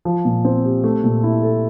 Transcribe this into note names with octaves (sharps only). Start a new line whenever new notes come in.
F3
A#2
C4
G4
A3
A#2
E4
A4